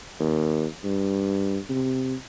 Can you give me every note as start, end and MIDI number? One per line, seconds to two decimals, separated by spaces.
0.20 0.65 39
0.84 1.58 43
1.70 2.15 48